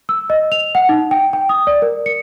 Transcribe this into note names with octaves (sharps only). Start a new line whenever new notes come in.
E6
D#5
F7
F#5
D#4
G5
G5
D#6
D5
A#4
C#7